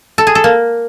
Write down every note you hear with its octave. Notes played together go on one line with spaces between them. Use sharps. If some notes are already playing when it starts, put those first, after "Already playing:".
A4
G#4
A4
A#3